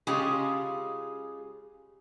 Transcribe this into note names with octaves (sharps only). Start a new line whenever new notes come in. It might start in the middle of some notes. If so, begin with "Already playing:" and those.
C#3 G#3 C#4 F4 G4 G#4